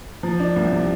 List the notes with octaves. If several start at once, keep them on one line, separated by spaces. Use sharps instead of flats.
F3
D4
C2
C3